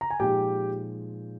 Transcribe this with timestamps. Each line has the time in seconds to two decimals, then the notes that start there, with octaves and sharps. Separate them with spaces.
0.01 A#5
0.10 G#5
0.20 A#2 F3 G#3 D#4 G4 G5